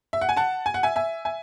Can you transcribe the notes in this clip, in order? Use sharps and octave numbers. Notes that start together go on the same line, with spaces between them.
E5
F#5
G#5
F#5 A5
G#5
F#5
E5 G#5
E5 G#5
E5 G#5